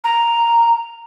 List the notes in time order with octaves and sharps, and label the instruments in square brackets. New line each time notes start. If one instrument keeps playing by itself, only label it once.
[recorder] A#5